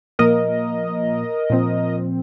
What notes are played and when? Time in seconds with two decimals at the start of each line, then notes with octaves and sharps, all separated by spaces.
0.19 A#2 F3 A#3 A#4 D#5
1.50 A#2 F3 C4